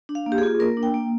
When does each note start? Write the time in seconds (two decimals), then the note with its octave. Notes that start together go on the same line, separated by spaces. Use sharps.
0.09 D4
0.15 F5
0.26 A#3
0.32 G4
0.38 G#4
0.43 F4
0.60 A#3 A#4
0.77 D4
0.83 G5
0.94 A#3